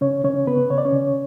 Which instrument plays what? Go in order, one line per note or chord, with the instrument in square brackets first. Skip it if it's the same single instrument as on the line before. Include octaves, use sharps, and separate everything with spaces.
[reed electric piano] C#3 C#4 C#5
C#3 C#4 C#5
C#3 B3 B4
C#3 C#5
D5
C#4 C#5
C#3